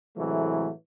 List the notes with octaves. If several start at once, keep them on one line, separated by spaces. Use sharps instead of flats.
A2 C3 E3 F#3 G#3 A3